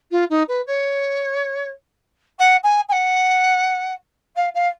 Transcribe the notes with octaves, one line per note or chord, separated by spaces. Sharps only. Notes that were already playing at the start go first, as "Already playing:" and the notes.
F4
D#4
B4
C#5
F#5
G#5
G#5
F#5
F5
F5